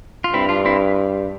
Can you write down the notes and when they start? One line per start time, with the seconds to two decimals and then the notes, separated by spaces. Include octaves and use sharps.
0.24 F4
0.33 G2 C4 E4
0.49 D4 F4
0.65 C4 E4